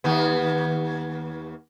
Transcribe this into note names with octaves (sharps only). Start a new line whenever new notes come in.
D#2 B3